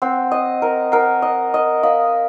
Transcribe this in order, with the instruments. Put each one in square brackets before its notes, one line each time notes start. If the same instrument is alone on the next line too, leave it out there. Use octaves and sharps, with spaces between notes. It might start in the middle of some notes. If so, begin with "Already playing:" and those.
[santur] C4 [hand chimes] F#5
[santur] D#5
A#4
[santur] A#4 [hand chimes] F#5
[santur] D#5
D#5
[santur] D#5 [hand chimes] F5